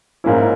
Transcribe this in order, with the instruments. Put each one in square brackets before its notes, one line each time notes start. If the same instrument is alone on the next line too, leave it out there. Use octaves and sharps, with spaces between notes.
[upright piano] G#2 F3 A#3 C#4 E4